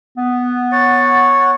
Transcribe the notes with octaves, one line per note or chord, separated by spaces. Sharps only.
B3
C#5 F#5 A6